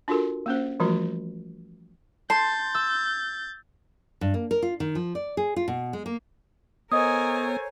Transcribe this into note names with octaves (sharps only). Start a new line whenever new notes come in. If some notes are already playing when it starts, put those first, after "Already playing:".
D4 F4 F#4 A4 A#4
A#3 C#4 C5
E3 F3 G3 A3 F4 F#4
A5 C6 G6 A6
E6
G2
A#3
A#4
F4
D#3
F3
D5
G#4
F4
B2
G#3
A#3
B3 A4 A#4 C5 C#5 D#5 G#5 D#6